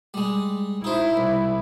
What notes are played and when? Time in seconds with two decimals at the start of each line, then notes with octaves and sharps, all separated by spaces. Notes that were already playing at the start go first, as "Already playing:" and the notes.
0.14 G3 G#3
0.84 D#4 E4 C5
1.17 C2